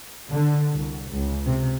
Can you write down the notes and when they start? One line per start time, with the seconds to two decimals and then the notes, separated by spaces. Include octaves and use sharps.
0.31 D3
0.72 C2
1.11 C#2
1.45 C3